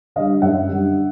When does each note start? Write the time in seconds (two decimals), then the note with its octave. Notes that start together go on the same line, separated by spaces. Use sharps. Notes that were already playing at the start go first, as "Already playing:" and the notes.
0.16 D3 G3 D#5 F5
0.42 F#2 E5 F#5
0.68 D3 G3